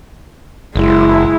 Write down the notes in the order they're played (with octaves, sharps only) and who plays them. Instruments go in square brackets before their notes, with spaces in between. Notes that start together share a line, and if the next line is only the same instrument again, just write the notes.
[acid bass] F#1 [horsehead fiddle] G#3 E4